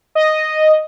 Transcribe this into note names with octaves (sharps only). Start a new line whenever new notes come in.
D#5